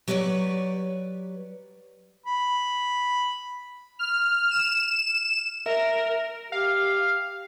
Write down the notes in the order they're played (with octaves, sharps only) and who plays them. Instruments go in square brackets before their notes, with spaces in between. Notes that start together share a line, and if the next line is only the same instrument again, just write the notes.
[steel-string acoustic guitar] F#3 G4 B4 C#5 D5
[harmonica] B5
[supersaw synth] F6
E7
[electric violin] A#4 [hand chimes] E5
[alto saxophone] G4 [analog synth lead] F5